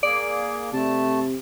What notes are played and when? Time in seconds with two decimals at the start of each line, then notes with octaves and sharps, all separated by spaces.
0.03 A#3 G#4 D5
0.73 C3 A3 A5